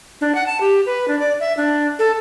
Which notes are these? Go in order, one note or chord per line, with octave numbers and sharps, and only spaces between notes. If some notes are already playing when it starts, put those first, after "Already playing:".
D4
F#5
A5
G4
B4
D4
D5
E5
D4
A4